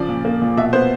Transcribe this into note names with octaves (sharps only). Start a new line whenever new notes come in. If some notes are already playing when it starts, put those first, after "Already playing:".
Already playing: C#3 F3 D5
A#2
A#3
A#2
B2 E5
B3 C5